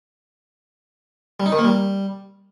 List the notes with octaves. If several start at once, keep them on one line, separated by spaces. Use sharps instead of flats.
G3
D#4
D#3
A#3
G3